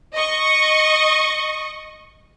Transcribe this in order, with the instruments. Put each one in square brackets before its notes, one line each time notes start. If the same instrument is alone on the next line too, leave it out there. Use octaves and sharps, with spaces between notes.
[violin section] D#5 C#6